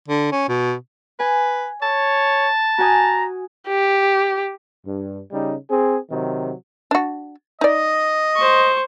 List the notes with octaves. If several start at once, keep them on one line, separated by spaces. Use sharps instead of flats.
D3
C#4
B2
B4 G#5
C#5 A5
F#4 G#5 A#5 D#6
G4
G2
C#3 G3 D#4
C4 G#4
C3 D#3 F#3
D4 F#4
D#4 D5 D#5
C5 C#6